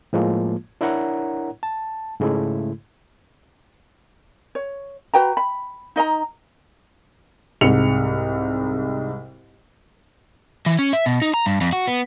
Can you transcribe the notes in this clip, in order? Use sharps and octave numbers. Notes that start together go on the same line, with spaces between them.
A2 F3 G#3 A#3 F4
D4 E4 A#4 C#5 F#5 A#5
A5
G#2 C#3 G#3 A3 E4
C#5
F#4 B4 G5 A#5
B5
D#4 D#5 F5 A#5
C2 G#2 C#7 F7
E3
C#4
E5
B2
D#4
A#5
G2
F2
F#4
B3